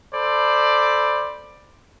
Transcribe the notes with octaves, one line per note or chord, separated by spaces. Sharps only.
A4 C5 D5 B5